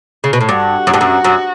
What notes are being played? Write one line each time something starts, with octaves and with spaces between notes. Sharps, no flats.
C#3
B2
A2
G2 F#4
F#2
G2
F#2
F#2